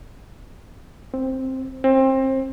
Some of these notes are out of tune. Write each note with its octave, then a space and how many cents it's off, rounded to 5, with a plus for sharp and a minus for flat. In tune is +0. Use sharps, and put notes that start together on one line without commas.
C4 +5
C4 +25